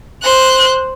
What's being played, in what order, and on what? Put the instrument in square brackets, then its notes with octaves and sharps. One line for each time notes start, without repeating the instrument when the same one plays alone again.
[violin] C5 F#6